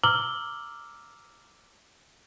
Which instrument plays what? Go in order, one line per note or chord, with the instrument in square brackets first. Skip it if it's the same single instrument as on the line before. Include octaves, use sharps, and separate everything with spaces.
[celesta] A#5 D6 E6 F6 F#7 G7